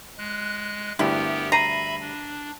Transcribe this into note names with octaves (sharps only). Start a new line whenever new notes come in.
G#3 F#6
D2 G2 B3 E4 G4 A#4
E5 A#5 B5 A#6 C7 D#7
D4